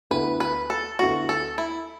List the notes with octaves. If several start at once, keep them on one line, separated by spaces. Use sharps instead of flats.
D2 D3 B3 E4 B4
B4
A4
D2 D3 B3 E4 F#4
A4
E4